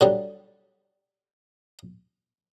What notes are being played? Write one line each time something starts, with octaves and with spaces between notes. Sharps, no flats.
D3 F#3 G3